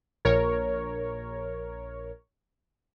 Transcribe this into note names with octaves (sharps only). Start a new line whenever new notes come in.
A#1 A#4 C#5